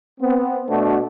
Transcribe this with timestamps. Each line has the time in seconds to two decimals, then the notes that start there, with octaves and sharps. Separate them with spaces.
0.20 B3 C4
0.69 B2 A3 D4 F#4